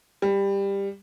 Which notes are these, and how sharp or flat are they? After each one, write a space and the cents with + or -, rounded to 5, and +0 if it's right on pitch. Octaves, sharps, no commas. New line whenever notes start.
G3 +15